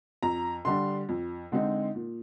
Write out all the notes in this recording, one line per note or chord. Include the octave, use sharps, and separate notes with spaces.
F2 A#5
D3 G3 D4 C6
F2
D3 G#3 C4 D#4
A#2